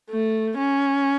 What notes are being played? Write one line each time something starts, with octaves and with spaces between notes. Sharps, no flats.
A3
C#4